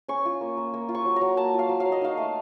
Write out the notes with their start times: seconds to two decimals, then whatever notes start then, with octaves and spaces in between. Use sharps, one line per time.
0.08 C#4 C#6
0.25 F4
0.41 A#3
0.57 A#3
0.74 A#3
0.89 F4
0.95 C#6
1.05 F#3
1.16 A#5
1.21 F#3
1.37 A#3 A5
1.54 F4
1.59 F5
1.69 F#3
1.80 F5
1.86 F#3
1.92 D#5
2.01 D#4 F5
2.17 A3